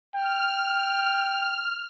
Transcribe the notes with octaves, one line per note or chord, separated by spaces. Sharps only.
G5 F6